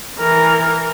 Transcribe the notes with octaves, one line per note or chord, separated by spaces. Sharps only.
E3 A#4